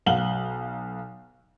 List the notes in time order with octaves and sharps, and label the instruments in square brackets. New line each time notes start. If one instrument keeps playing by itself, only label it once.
[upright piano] B1 F5 F#5 F#7 G7